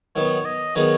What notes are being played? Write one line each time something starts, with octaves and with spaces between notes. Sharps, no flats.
D#3 F#3 B3 C#5
D#5
D#3 F#3 B3 D#4 G#4 C#5